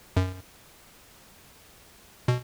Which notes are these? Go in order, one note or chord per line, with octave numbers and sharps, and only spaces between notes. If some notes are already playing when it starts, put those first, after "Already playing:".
F#2
B2